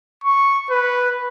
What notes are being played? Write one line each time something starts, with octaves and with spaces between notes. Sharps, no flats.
C#6
B4